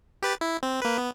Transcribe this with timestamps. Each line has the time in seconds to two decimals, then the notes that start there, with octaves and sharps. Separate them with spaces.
0.22 G4 B4 A6
0.41 E4
0.63 C4
0.82 A#3 B4
0.98 B3